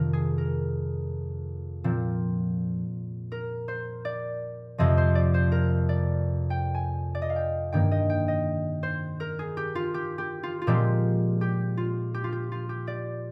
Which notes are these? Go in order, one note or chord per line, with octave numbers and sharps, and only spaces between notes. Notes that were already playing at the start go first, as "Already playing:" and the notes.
Already playing: F2 C3 D#3 A#4
G#4
A#4
A#2 F3 C4
A#4
C5
D5
F2 C3 F3 D#5
C5
D5
C5
A#4
D5
G5
G#5
D5
D#5
F5
G5
G2 D#3 A#3 G5
D#5
G5
D#5
C5
A#4
G#4
G4
F4
G4
G4
F4
F4
A#2 F3 G#3 C4 G4
G4
F4
G4
F4
G4
F4
G4
D5